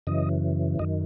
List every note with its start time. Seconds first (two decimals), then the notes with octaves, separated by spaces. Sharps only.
0.07 F#2 C#3 E3 D#5
0.79 F#2 D#3 D#5